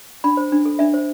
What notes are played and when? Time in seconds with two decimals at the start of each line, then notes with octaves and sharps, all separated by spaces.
0.24 D4 B5
0.37 C5
0.52 D4
0.65 A4
0.79 D4 E5
0.94 C5